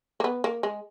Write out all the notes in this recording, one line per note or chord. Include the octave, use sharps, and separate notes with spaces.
A#3
B3
A#3
G#3